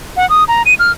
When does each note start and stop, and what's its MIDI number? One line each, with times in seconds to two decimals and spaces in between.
0.17 0.28 78
0.30 0.44 87
0.48 0.63 82
0.66 0.74 99
0.79 0.92 89